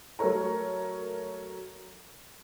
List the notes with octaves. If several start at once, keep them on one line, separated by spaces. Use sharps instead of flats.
F#3 A3 A4 A#4 C#5 A#5